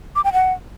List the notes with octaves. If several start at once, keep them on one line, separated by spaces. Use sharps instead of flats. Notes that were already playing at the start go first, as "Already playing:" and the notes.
D6
G5
F#5